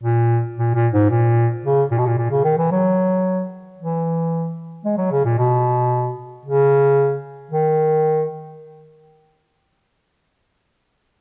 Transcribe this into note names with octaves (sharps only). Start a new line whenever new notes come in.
A#2
A#2
A#2
G#2
A#2
C#3
A#2
B2
A#2
A#2
C#3
D#3
E3
F#3
E3
G#3
F#3
C#3
A#2
B2
C#3
D#3